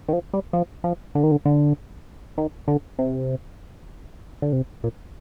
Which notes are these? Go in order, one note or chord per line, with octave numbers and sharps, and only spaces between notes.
D#3
F3
G3
F3
F3
D3
D#3
D3
D3
D#3
D3
C3
D3
C3
A#2